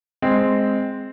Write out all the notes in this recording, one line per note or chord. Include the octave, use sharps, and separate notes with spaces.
G#3 C4